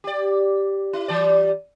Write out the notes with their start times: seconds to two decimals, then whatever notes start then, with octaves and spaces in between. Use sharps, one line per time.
0.04 G4 D5
0.93 E4
1.08 E3 G3 D5